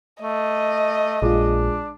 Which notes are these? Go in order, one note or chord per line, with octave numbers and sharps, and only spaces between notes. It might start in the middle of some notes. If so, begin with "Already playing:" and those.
A3 D#5
A#1 G#3 D4 F4